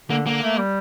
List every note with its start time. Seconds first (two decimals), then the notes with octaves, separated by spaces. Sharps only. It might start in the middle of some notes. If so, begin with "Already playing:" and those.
0.10 D3 A#3
0.26 D3 A#3
0.42 A3
0.59 G3